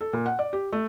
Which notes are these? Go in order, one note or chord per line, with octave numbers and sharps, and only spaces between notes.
A4
A#2
F#5
D5
G4
A3